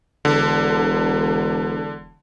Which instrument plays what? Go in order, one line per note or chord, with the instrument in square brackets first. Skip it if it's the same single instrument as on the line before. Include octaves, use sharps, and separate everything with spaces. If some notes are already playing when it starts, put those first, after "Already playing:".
[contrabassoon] E1 [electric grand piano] D3